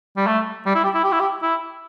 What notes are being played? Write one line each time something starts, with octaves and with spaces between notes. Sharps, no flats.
G3
A3
G3
E4
G4
E4
G4
E4
G4
E4